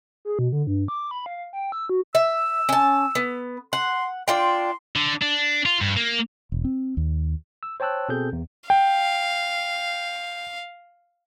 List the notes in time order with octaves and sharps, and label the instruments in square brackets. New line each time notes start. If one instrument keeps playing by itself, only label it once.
[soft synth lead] G#4
B2
D3
G2
D6
B5
F5
G5
E6
F#4
[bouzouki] E5 [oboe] E6
[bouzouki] C#4 A5
B3
[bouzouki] F#5 [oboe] C6
[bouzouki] D4 F4 G5 [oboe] C6
[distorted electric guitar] D3
D4
F4
G2
A#3
[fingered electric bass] E1
C4
D#2
[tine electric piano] E6
C5 C#5 G5 A5 E6 F#6
B2 C4 G#4 A4 G6
E2
[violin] F5 [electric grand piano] G5